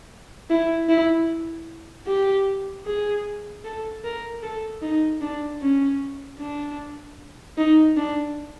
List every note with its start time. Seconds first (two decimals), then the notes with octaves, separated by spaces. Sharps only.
0.50 E4
0.89 E4
2.07 G4
2.86 G#4
3.64 A4
4.04 A#4
4.43 A4
4.82 D#4
5.21 D4
5.62 C#4
6.40 D4
7.58 D#4
7.97 D4